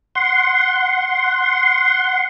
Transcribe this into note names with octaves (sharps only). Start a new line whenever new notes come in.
F#5 C6